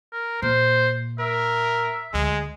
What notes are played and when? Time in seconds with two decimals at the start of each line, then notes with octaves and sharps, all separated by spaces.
0.13 A#4
0.42 A#2 C5
1.19 A#4 E5
2.14 D2 G#3